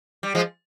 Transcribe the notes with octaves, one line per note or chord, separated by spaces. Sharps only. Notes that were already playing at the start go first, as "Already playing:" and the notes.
G3
F3 G#3